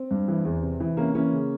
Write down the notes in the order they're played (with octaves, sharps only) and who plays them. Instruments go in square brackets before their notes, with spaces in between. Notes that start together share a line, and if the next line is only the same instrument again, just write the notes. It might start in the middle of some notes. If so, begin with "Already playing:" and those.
Already playing: [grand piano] C4
G2
E3
E2
C3
E3
C3 A#3 C#4
E3 A#3 C#4
C#3